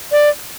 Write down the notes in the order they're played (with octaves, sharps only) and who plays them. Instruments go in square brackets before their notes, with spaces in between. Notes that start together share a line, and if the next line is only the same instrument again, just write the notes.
[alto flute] D5